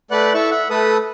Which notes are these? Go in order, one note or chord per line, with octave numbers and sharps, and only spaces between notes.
A3 B4 D5 F#5 F#6
E4 A4 E5 A5 C#6
E5 F#5
A3 A4 B4 D#6